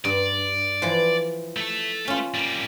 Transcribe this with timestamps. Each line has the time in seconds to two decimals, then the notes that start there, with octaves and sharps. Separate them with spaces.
0.05 G2 D5
0.82 E3 F3
1.57 A3 A4
2.08 C#4 F4
2.34 G3 A#3